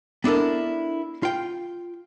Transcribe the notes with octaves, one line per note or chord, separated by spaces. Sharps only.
B3 D4 E4 A4 A#4
F4 G5